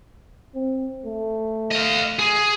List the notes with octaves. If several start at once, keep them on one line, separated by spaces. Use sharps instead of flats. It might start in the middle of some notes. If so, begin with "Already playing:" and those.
C4
A3
D#5 F5
G#4